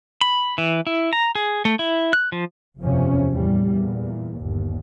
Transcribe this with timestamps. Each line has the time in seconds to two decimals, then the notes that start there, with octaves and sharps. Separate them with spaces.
0.21 B5
0.58 E3
0.87 E4
1.13 A#5
1.35 G#4
1.65 A3
1.79 E4
2.13 F#6
2.32 F3
2.80 F#1 E2 C3 F3 C#4
3.33 E2 A2 G3
3.70 E2 A#2
4.37 G1 D#2